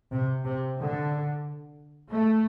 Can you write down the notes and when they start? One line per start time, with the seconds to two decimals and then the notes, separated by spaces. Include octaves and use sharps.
0.11 C3
0.45 C3
0.78 D3
2.09 A3